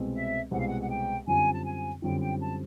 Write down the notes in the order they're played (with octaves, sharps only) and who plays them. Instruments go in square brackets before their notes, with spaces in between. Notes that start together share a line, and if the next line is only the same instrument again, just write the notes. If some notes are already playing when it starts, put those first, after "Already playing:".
Already playing: [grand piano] C2 B2 G#3 C4
[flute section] E5
[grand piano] C2 B2 G#3 C4 [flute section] F#5
[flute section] F5
F#5
F#5
G5
[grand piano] F#2 D3 G3 C4 F4 [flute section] G#5
[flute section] A5
G#5
[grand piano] F#2 D3 G3 C4 F4 [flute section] G5
[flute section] G5
A5